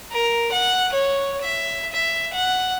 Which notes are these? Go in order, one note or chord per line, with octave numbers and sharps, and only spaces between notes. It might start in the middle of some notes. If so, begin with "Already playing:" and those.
A#4
F#5
C#5
E5
E5
F#5